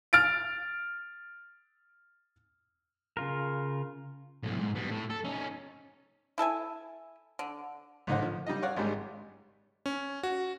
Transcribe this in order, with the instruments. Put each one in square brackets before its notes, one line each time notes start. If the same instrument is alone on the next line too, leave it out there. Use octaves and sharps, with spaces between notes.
[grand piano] F6 A6 D7
[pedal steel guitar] C#3 F4 A#4
[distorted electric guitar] B1 A2
G#2
B2 G3
A2
A4
C#4 D#4
[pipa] E4 A4 E5 G#5
D3
[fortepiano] A1 D3 D#4 C5 F#5
F3
G3 D#4 D#5
C#5 D5 F5 F#5
G#1 G#2 G3 G#3
[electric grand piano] C#4
F#4